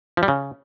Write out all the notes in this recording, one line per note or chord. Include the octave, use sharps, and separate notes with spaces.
F3
G3
C#3